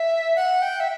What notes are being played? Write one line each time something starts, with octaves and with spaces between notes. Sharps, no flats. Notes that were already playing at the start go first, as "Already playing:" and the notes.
Already playing: E5
F#5
G5
E5